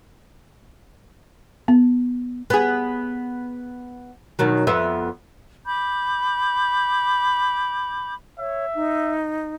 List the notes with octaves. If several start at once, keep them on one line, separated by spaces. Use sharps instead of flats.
B3
B3 G#4
B2 D#3 F#3
F2 B3 E5
B5 D6 G6
C#5 E5
D#4